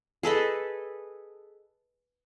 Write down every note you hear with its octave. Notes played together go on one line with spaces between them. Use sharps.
G#4 A4 B4 D#5